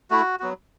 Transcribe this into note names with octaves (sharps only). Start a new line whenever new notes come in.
A3 E4 F#4
F#3 B3 F#4